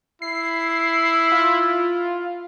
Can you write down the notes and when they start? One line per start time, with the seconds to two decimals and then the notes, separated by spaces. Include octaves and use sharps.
0.22 E4 C7
1.32 F4